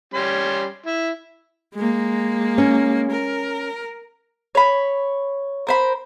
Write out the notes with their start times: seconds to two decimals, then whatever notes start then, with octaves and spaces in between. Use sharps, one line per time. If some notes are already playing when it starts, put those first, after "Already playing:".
0.14 G3 C#4 C6
0.86 E4
1.75 G#3 A#3
2.58 C#4
3.11 A#4
4.55 C#5 B5
5.67 A#4 C5 B5